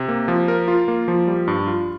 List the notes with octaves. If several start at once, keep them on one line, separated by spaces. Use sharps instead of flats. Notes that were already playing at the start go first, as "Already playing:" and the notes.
Already playing: C3
A#3
F3
A#4
F4
A#3
F3
G3
G2
F4